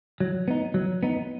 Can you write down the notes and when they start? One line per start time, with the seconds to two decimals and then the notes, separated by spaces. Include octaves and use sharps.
0.20 F#3
0.48 B3 D#4
0.74 F#3
1.03 B3 D#4